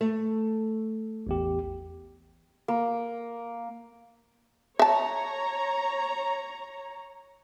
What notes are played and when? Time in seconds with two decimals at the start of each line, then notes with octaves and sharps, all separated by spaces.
0.01 A3
1.27 A1 E2 G4
2.68 A#3
4.79 C#5 E5 A5 A#5